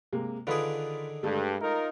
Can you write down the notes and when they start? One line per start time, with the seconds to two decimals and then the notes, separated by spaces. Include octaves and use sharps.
0.13 C3 G#3 A#3
0.47 D3 D#3 F4 G#4 B4
1.23 G2 G#3 A3 A4
1.60 D#4 F4 A#4